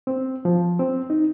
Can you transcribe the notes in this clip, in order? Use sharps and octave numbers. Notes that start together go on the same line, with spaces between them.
C4
F3
C4
D#4